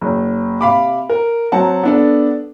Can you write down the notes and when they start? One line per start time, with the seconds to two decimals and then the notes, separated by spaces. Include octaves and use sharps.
0.01 F#1
0.61 C3 F5 B5 D6
1.09 A#4
1.52 F#3 C4 F#5 A5 A#5
1.83 B3 D4 A4